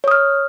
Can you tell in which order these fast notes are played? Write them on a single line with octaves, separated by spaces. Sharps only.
C#5 D#6 F6